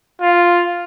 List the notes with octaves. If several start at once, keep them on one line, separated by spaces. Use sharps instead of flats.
F4